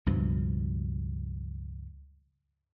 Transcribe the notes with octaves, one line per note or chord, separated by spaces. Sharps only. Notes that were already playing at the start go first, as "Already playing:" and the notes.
C#2 G2 B2 F3